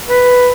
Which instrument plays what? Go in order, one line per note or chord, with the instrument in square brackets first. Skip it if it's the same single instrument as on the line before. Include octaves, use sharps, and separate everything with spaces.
[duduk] B4